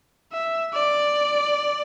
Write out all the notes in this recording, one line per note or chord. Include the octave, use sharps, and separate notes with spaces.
E5
D5